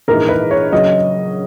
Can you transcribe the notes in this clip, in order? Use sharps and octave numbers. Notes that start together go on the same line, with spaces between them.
A#1 G#2 E3 A#3 D#4 A#4
B4
C#5
C#3 F#3 C#4 D#5